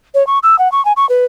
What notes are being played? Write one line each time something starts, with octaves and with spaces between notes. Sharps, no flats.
C#5
C#6
E6
F#5
C#6
G#5
C#6
B4